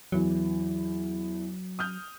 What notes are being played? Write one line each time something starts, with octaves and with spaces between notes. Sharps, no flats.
E2 E3 F#3
D#6 F6 G6